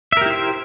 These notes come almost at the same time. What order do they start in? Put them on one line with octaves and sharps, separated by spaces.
E5 A#4 G4 E4 C5